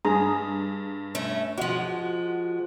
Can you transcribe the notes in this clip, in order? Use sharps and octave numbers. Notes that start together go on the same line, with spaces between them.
G2 G#4 A#5
A3 C#4
F3 G#3 F#4 F#5 F7